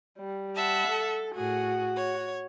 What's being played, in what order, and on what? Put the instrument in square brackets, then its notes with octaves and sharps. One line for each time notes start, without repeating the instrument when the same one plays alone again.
[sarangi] G3
[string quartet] E5 F#5 A5
[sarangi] A4
[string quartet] A2 G#4 [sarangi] F#4
[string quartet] C#5